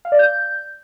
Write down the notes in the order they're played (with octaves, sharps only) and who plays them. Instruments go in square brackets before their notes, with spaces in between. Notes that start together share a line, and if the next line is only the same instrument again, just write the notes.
[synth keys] F5
D5
G6